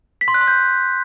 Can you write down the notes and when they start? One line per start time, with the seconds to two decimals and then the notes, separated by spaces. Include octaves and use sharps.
0.21 B6
0.28 C6
0.34 F#6
0.41 C6
0.48 G6